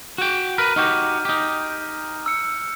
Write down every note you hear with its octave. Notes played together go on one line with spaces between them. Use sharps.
F#4 G5
A#4 B4 F6 D#7
D#4 F#4 G4 F6 G6
D#4 G4
E6 C#7